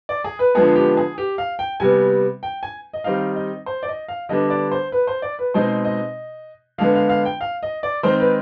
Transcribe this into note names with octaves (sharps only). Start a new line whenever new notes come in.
D5
G#4
B4
D3 F3 G#3 B3 G#4
G4
G#4
G4
F5
G5
C3 G3 B3 G#5
G5
G#5
D#5
D#3 G3 C4 D#4 F5
D#5
C5
D5
D#5
F5
D3 G3 B3 D4 D#5
D5
C5
B4
C5
D5
B4
B2 G#3 C4 D#4 C5
D#5
D3 G#3 B3 F5
F5
F5
G5
F5
D#5
D5
D#3 G#3 C4 D#4 C5
B4